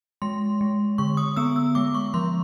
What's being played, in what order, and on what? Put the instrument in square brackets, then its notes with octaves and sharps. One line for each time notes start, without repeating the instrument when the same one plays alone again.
[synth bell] G#3 C6
G#3
D3 C#6
D#6
B3 E6
E6
G#3 D6
C#6
F3 C6